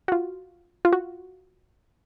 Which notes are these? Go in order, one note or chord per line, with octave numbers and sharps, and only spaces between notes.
F#4
F4
F4
F#4